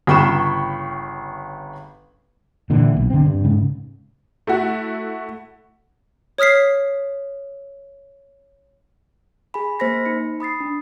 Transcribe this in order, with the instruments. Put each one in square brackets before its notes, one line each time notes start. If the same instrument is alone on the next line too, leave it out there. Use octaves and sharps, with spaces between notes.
[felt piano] G1 C#3 G5 B5 C#6 E7
[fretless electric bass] A#2 D3 E3
B1
D3 C4
G2
G#2 C#3
[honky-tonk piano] A3 E4 F#4
[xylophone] C#5 D#6 F6 B6 C7
[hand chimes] G#4 G#5 B5
A#3 C5 B5 A#6 B6
D#4 C#7
B5 D#6 A6 C7
D4